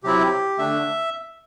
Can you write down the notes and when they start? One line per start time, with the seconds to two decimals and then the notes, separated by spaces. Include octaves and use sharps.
0.03 C3 F#3 C4 E4 G4
0.58 D3 A3 D4 E5